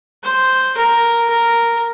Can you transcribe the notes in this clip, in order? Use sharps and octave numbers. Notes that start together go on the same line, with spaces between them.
C5
A#4
A#4